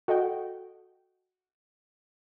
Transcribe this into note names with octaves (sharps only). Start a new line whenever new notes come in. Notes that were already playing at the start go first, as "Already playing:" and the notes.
F#4 A4 D#5 F#5 G5